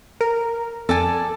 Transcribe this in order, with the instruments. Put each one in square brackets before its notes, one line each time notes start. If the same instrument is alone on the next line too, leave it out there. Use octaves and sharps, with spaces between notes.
[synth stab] A#4
[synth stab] F2 [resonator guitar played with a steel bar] A4 D5 G#5